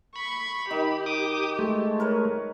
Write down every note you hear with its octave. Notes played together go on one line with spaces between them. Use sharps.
B5 C#6
D#3 D#4 G4
D6 D#6
G#3 A3
A#4 B4 C#5